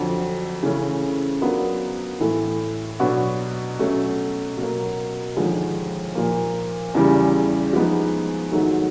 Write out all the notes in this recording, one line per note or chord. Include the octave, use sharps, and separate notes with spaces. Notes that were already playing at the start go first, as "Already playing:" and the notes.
Already playing: F2 D3 F#3
C#3 E3 A3 C#4
F#3 B3 D4 F4 A#4
A2 E3 A3
B2 F#3 B3 D4 F#4
B2 F#3 A3 C#4
B2 F#3 A#3
D#2 D3 F3 G#3
A#2 F3 A#3
E2 C#3 E3 G3
F3 G#3 B3 D#4
G#2 D#3 F#3 A3